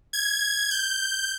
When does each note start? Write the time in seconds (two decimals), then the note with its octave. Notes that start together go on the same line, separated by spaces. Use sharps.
0.13 G#6
0.71 G6